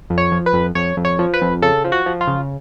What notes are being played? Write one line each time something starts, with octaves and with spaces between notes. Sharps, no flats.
F2
C#5
F3
B4
F2
F2 C#5
F2
C#5
F3
B4
F2
C#3 A4
F3
F#4
F3
F4
C#3